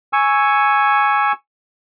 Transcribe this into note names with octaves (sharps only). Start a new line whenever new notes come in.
G#5 C#6 E6